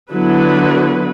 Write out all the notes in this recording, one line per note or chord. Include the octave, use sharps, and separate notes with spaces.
D3 F#3 B3 E4 B4